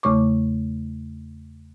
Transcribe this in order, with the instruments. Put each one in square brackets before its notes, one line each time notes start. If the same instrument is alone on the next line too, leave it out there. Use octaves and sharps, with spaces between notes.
[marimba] E2 C#3 A3 C#5 C#6 D6